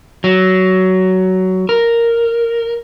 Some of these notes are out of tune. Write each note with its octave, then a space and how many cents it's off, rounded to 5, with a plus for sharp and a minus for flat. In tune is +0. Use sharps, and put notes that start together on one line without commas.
F#3 +15
A#4 -5